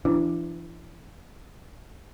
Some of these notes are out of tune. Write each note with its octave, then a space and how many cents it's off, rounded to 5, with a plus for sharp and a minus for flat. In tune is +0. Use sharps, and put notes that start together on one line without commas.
E3 +35 D4 +0